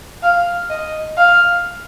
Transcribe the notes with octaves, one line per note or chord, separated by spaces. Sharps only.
F5
D#5
F5